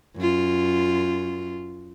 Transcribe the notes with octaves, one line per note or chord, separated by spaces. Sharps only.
F#2 F4